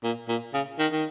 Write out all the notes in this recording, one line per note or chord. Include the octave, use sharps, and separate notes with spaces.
A#2
A#2
C#3
D#3
D#3